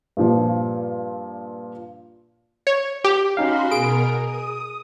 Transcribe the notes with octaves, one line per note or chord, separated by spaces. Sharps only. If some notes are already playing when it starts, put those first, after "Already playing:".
G2 A#2 F3
C#5
G4
C#4 D#4 F#4 F5 B5 C6
B2 G#4 A#4 D7
D#6